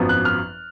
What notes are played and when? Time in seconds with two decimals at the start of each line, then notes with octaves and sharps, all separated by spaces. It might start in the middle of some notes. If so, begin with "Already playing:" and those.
Already playing: G#1 F#2 F3 B3
0.09 F#6
0.25 F6